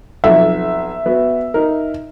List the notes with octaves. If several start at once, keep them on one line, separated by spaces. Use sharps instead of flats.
B1 F2 E5
B3 F#4
D#4 A#4